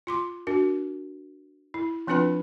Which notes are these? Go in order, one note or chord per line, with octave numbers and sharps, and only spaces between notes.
F4 C6 D6
D4 F#4 A#4
E4
F3 C4 D4 F4 B4 B5